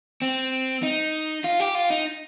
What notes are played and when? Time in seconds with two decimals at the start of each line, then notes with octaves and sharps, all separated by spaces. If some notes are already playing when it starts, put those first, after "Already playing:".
0.22 C4
0.83 D#4
1.44 F4
1.60 G4
1.75 F4
1.90 D#4